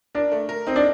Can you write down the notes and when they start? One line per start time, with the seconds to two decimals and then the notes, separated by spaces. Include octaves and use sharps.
0.15 D4 A#4
0.32 A3
0.49 A#4
0.67 C4 D#4
0.76 D4